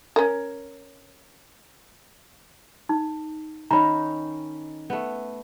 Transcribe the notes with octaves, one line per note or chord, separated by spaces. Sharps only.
C#4 A#4
D#4
D#3 C#4 D#4 A#5 B5
A3 B3